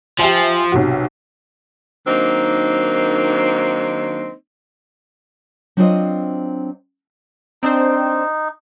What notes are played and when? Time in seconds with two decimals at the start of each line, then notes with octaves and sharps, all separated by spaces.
0.19 F3 G4 E5 G#5
0.72 B1 C3 F#4
2.07 D#3 F#3 A#3 C4 D4 D#4
5.77 F#3 C4 D4 F4 C5 D#5
7.63 C4 D4 D#4 C5